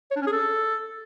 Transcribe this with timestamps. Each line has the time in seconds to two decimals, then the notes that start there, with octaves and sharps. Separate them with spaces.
0.11 C#5
0.16 D4
0.22 C#4
0.27 G#4
0.32 A4